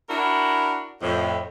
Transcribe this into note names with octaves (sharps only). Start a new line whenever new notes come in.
D4 E4 F#4 A#4
F2 A2